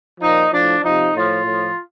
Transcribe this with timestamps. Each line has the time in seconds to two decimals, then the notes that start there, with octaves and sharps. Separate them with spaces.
0.21 A#2 F3 D#4
0.52 A2 F3 D4
0.83 C3 F3 D#4
1.14 A2 F3 F4
1.45 A2 F3